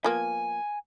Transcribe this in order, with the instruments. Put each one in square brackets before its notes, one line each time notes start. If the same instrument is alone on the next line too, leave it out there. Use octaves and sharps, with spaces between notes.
[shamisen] F3 A#3 B3 [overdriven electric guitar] G#5